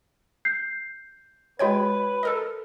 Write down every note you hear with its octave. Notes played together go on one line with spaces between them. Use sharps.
G6 C7
G#3 F#4 B4 C#5 G5 G#6
A4 A#4 D#5